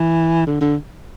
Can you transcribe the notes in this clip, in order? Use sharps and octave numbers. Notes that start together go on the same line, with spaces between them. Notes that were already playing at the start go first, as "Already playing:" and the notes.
Already playing: E3
D3
D3